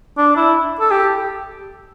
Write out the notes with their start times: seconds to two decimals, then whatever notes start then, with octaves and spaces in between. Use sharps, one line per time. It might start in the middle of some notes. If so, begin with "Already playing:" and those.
0.18 D4
0.37 E4
0.80 A4
0.91 G4